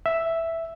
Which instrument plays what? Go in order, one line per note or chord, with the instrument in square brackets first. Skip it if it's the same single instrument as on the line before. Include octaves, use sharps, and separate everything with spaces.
[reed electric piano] E5